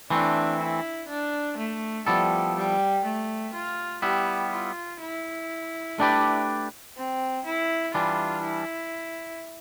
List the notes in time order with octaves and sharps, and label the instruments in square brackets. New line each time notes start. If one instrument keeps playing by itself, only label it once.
[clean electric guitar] E3 A3 C4 [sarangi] D4
[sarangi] E4
D4
A3
[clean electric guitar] F3 B3 E4 A4 D5 [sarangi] G3
[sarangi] G3
A3
F4
[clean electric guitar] G3 B3 E4 [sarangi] G4
[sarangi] F4
E4
[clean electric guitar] A3 D4 G4 B4 D5
[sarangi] C4
E4
[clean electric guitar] E3 G3 D4 [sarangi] F4
[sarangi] E4